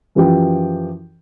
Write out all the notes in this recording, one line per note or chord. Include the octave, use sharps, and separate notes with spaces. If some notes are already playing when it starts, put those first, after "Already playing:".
F#2 E3 F3 G4 G5